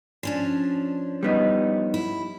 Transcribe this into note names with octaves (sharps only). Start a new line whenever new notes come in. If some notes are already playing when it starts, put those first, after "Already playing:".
F3 C#4 D4
G3 B3 D#4
E4